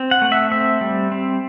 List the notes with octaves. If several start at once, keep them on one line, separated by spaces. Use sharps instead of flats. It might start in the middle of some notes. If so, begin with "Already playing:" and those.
Already playing: C4
F#5
A3
E5
C4 E5
G3
C4